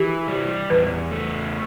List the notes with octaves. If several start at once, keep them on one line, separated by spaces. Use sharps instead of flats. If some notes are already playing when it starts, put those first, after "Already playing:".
Already playing: E3 G4
G3
E2 B4
A3